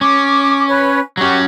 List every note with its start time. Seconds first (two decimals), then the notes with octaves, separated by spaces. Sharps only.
0.01 C#4 D6
0.68 B4 C#5
1.17 F#3 C#4 F#4 G4